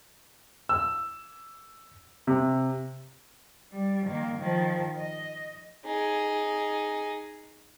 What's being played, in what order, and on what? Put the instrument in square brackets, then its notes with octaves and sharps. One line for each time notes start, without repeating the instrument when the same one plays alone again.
[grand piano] E6
C3
[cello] G3
D#3 A#3
D#3 F3
D#5
[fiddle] D#4 G#4